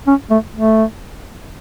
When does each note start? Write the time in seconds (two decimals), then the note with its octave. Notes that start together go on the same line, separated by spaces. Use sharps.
0.07 C#4
0.30 A3
0.55 A3